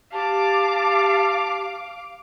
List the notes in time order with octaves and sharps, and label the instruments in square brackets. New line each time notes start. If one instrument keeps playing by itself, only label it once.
[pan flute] G4 [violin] F5 D6 [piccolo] A5